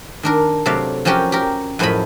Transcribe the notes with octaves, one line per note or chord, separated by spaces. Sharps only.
D#3 D4 A#4
C3 F#3 A3 D5 F5
F3 F#3 C#4 G4 A#4
G4 A#4
F#2 A2 F3 G#4 D#5 B5